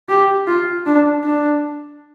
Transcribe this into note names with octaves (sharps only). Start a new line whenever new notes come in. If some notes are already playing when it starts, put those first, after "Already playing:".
G4
F4
D4
D4